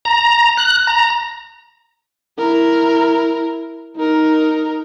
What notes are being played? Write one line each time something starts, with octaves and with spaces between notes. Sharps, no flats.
A#5
F#6
A#5
E4 A#4
D#4 A#4